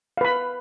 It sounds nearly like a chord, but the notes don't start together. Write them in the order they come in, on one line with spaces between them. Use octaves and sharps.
F5 B4 B5